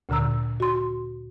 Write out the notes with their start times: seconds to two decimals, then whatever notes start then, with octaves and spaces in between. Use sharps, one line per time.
0.09 D2 A#2 D3 A#5 E6
0.60 F#4 C6